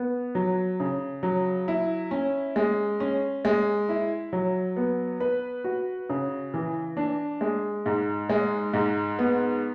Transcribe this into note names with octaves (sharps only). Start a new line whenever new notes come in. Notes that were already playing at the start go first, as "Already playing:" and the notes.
Already playing: B3
F#3
C#3
F#3
E4
C#4
G#3
C#4
G#3
E4
F#3
B3
B4
F#4
C#3
E3
D4
G#3
G#2
G#3
G#2
B3